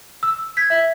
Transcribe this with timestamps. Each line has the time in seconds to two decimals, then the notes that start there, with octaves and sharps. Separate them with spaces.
0.23 E6
0.57 G6 G#6 B6
0.70 E5